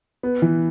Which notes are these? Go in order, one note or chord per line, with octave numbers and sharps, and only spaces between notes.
B3
E3